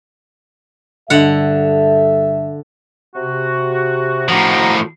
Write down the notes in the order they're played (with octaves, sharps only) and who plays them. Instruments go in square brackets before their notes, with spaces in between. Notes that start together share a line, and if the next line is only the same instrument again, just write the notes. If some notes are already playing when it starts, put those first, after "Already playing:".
[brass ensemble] G2 A4 E5 [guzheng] D3 F#5
[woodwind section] C3 F#4
[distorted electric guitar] A2 F3 [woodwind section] F#4 A#5